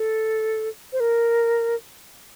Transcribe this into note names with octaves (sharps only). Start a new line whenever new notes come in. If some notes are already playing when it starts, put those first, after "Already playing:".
Already playing: A4
C5
A#4